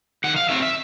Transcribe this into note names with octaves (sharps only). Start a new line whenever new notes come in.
D#3 F#5
F5
F#3 A3 C4 E5
E5